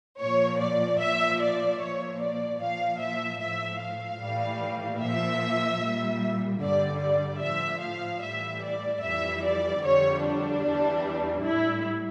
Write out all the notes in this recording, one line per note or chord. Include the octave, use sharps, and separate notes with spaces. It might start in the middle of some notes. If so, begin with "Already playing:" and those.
A#2 F3 C#5
D5
A#2 F3 E5
D5
A#2 F3 C#5
D5
A#2 F3 F5
E5
A2 F3 E5
F5
A2 E3 G3
A#2 F3 E5
A#2 G3
G2 D3 G3 D5
D5
A2 F3 E5
F5
A2 E3 G3 E5
D5
F2 E3 G3 E5
D5
F2 D3 G3 C#5
D4
E2 E3 G3
A2 G3 E4